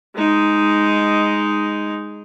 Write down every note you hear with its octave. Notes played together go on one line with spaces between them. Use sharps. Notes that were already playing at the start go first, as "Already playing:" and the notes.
G#3 D#4